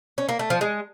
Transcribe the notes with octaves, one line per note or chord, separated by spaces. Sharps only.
C#4
A#3
A3
F3
G#3